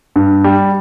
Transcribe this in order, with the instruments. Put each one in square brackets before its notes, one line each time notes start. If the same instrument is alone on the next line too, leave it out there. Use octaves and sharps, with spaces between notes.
[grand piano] G2
G3